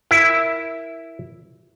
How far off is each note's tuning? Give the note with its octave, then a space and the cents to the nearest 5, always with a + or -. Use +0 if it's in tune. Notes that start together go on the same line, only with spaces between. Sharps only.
E4 +0 A#4 +0